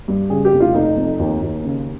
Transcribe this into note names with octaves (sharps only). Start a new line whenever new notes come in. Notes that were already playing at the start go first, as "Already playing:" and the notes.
G2
C#3 G#4
G4
F1
F4
F1 D#4
F2
D#2
D#2
C#3